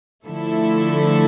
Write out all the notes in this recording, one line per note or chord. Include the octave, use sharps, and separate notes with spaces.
D3 F3 A3 E4 A4